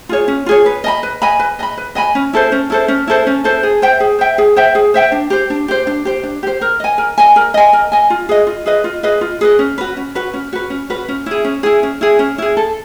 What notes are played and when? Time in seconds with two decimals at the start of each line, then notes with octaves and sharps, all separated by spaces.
0.09 F4 G#4 C#5
0.28 C#4
0.46 F4 G#4 C#5
0.66 B4
0.84 D#5 G#5 B5
1.03 B4
1.22 D#5 G#5 B5
1.40 B4
1.59 D#5 G#5
1.63 B5
1.78 B4
1.95 D#5 G#5 B5
2.15 C#4
2.33 E4 A4 C5
2.52 C#4
2.70 E4 A4 C5
2.88 C#4
3.07 E4 A4 C5
3.27 C#4
3.44 E4 A4 C5
3.63 G#4
3.82 C5 E5 G5
4.00 G#4
4.19 C5 E5 G5
4.38 G#4
4.56 C5 E5 G5
4.75 G#4
4.94 C5 E5 G5
5.12 D4
5.30 G4 C5
5.50 D4
5.68 G4 C5
5.87 D4
6.05 G4 C5
6.23 D4
6.43 G4 C5
6.61 A#4
6.80 D#5 G#5
6.98 A#4
7.18 D#5 G#5
7.36 A#4
7.54 D#5 G#5
7.73 A#4
7.92 D#5 G#5
8.10 F4
8.29 G#4 B4 D#5
8.47 F4
8.66 G#4 B4 D#5
8.84 F4
9.03 G#4 B4 D#5
9.21 F4
9.41 G#4 B4 D#5
9.59 C#4
9.78 F#4 B4
9.97 C#4
10.15 F#4 B4
10.33 C#4
10.53 F#4 B4
10.70 C#4
10.90 F#4 B4
11.08 C#4
11.26 E4 G#4
11.44 C#4
11.63 E4 G#4
11.83 C#4
12.01 E4 G#4
12.19 C#4
12.38 E4 G#4
12.57 A4